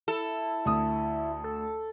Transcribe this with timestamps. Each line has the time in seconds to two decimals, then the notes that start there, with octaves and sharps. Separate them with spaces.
0.08 E4 A4
0.65 D2 D#6
1.44 A4